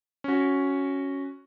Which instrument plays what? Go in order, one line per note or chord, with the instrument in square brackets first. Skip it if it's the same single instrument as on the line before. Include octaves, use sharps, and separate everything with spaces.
[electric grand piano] C#4 F#4